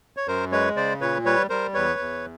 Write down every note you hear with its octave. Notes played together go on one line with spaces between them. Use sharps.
C#5
F#2 A#4 C5
G#3 B4 C#5
C#3 C5 D5
A#2 B4 C#5
G3 B4 C#5
G3 A#4 C5
E2 B4 C#5
E2